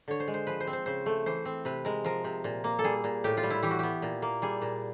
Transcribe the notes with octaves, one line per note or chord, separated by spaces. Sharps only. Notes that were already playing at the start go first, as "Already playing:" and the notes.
D3 C#5
C5
G#3
C5
F3 B4
C5
C4
C5
C#3 C5
A3
E3 C5
C4
C3 B4
G#3 A#4
F3 A#4
C3
A#2
A#3
A4
G3 G#4
A#2
A2 G4
F4
G3
E4
E3 G4
F#4
B3 G4
A#2
A#3
G3 G#4
A#2